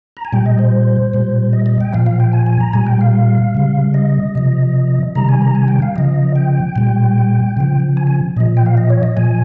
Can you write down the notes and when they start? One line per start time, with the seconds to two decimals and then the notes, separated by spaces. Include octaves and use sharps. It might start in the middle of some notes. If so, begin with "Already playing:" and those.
0.17 A#5
0.25 G#5
0.32 A#2 G3 G5
0.46 D#5
0.59 C5
1.14 A#2 G3
1.53 D#5
1.66 D#5
1.81 G5
1.93 A#2 F3 F5
2.06 F5
2.20 G5
2.33 G#5
2.46 G#5
2.60 A#5
2.73 A#2 G3 G#5
2.87 G5
3.01 F5
3.54 C#3 G3
3.94 D#5
4.35 C3 F3
5.15 C3 D#3 G3 A#5
5.29 G#5
5.42 A#5
5.55 G#5
5.68 G5
5.82 F5
5.96 C#3 F3 D#5
6.36 G5
6.76 A#2 G3
7.57 C#3 F3
7.97 G#5
8.07 G#5
8.36 A#2 F3 D#5
8.57 G5
8.66 F5
8.77 D#5
8.90 C#5
9.03 D#5
9.16 A#2 F3 G#5